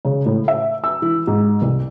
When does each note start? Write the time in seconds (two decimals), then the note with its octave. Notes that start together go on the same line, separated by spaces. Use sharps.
0.05 C#3
0.26 A2
0.48 E5
0.84 E6
1.02 E3
1.27 G#2
1.62 C2